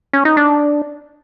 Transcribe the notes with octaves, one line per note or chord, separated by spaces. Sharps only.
C#4
D#4
D4